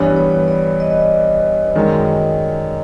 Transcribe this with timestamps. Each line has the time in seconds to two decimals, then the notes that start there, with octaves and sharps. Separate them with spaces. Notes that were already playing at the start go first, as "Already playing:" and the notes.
Already playing: G2 E3 G3 B3 C#5
0.16 C#5
0.48 D5
0.80 D#5
1.75 F#2 D#3 G#3